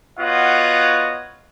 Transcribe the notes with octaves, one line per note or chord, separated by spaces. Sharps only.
B3 F4 F#4 C#5 D#5 F#5